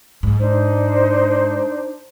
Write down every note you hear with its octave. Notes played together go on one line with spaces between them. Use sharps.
G#2
D4 D#4 C5